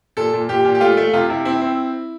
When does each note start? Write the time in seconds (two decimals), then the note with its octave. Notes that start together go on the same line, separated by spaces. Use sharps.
0.17 A#2 A4
0.33 A#2
0.49 A#2 G4
0.65 A#2
0.75 G4
0.81 A3 F4
0.97 A3
1.13 C3 F4
1.30 C3 E4
1.45 C4 E4
1.62 C4